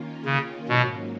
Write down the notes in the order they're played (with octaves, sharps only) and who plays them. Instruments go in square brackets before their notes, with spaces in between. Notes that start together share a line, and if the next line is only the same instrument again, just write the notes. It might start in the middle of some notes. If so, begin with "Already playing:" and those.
Already playing: [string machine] D#3 A#3 C#4 F4
[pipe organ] C#3
[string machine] G#2 F#3 A#3 C#4 [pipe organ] B2